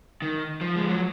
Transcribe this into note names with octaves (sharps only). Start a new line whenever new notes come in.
D#3
F3
G#3
F#3